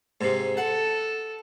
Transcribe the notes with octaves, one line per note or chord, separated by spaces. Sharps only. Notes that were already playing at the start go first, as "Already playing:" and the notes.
G#2 C3
A4 F#5